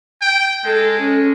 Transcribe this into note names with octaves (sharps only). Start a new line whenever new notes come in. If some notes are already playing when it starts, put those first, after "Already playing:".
G5
G#3 A4
C#4